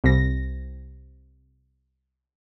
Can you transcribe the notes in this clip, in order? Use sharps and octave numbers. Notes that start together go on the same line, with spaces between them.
C2 A#6